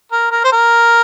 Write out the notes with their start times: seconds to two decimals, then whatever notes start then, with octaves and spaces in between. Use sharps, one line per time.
0.12 A#4
0.32 A#4
0.44 C5
0.53 A#4